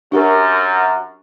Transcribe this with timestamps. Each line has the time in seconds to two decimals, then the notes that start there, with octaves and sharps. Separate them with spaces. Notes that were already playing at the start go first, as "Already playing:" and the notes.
0.12 F#2 D4 G4 A#4